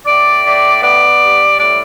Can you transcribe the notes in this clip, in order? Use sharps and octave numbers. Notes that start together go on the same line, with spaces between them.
A2 D5
A2
B3 D5
G3
A2 D5